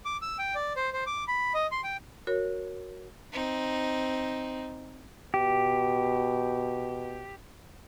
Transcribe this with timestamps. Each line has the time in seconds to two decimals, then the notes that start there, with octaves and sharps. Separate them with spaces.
0.05 D6
0.22 E6
0.39 G5
0.55 D5
0.76 C5
0.93 C5
1.06 D6
1.28 B5
1.54 D#5
1.71 C6
1.84 G5
2.27 F#4 A#4 C#5
3.33 C4 D#4
5.34 B2 G4